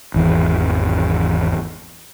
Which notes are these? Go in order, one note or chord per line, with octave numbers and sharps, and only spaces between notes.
G#1 E2 E3